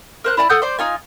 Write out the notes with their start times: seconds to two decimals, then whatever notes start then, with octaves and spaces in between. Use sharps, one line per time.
0.24 A#4 C5 F#6
0.37 E4 D5 G#5 A5
0.49 A4 F#5 D#6 G6
0.62 C5 D5 C6
0.79 D#4 F4 G#5